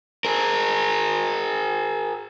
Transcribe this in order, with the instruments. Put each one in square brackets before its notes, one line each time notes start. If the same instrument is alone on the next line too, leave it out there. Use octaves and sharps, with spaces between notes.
[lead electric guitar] G#4 A#4